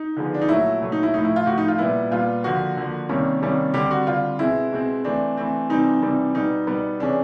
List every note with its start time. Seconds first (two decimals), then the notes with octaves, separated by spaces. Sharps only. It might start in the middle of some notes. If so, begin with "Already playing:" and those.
Already playing: D#4
0.16 D3 F3 G#3 B3
0.34 D4
0.41 D#4
0.49 A#2 F#3 A3 E4
0.81 A#2 F#3 A3
0.92 D#4
1.03 E4
1.14 A2 F3 A3 D#4
1.25 E4
1.36 F4
1.46 A2 F3 A3 F#4
1.58 D#4
1.68 F4
1.78 A#2 G3 B3 E4
2.11 A#2 G3 B3 F4
2.44 D3 F3 A#3 F#4
2.77 D3 F3 A#3
3.09 C3 D#3 G3 A#3 C#4
3.42 C3 D#3 G3 A#3 C#4
3.74 D3 G3 C4 G4
3.91 F#4
4.07 D3 G3 C4 F4
4.39 B2 G#3 C4 E4
4.73 B2 G#3 C4
5.04 E3 A3 C4 D4
5.37 E3 A3 C4
5.69 C3 E3 G3 C4 D#4
6.02 C3 E3 G3 C4
6.35 B2 G3 B3 D#4
6.67 B2 G3 B3
7.00 C3 E3 G#3 C#4 D4